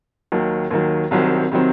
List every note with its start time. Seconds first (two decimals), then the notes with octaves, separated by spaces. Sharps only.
0.32 D#2 D#3 F#3
0.71 D#2 D#3 F#3
1.11 C2 C3 D#3 F#3 C4
1.52 C3 D#3 F#3 C4